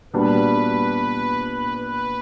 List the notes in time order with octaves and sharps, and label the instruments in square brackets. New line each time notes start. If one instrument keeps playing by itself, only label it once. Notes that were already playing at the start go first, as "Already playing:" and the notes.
[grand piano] A#2 G3 B3 D4 F#4 [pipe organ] B4
[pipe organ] B4
B4